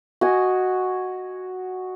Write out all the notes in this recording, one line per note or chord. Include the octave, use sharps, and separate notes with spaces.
F#4 D#5 G#5